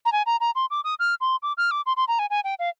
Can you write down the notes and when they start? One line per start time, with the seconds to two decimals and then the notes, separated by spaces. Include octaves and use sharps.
0.05 A#5
0.12 G#5
0.26 A#5
0.41 A#5
0.55 C6
0.71 D6
0.84 D#6
0.99 F6
1.21 C6
1.43 D6
1.58 F6
1.71 D6
1.86 C6
1.97 C6
2.08 A#5
2.19 G#5
2.30 G#5
2.44 G5
2.59 F5